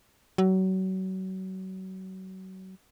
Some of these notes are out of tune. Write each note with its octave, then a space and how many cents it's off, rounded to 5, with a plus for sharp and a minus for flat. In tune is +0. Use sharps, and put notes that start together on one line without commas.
F#3 +30